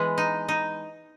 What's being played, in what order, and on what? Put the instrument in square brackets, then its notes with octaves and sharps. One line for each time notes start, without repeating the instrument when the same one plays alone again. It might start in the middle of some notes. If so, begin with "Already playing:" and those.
Already playing: [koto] E3 G#3 B3
D#4
D#4